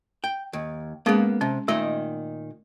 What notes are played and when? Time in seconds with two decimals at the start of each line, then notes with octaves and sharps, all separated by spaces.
0.24 G5
0.53 D#2
1.06 G#3 A#3 B3 C#4 G#4
1.41 C3 C#4
1.68 A#2 D#3 A3 D#5